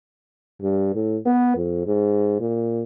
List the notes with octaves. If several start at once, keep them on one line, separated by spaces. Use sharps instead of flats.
G2
A2
B3
F2
G#2
A#2